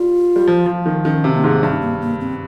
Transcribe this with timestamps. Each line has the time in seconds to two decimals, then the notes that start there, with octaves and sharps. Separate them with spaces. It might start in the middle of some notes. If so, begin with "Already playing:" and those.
Already playing: G3 F4
0.36 G3
0.47 F3
0.66 F3
0.86 D#3
1.05 D#3 C#4
1.24 C3
1.34 A#3
1.44 G#2
1.63 G2 C4
1.82 A#3
2.02 A#3
2.21 C4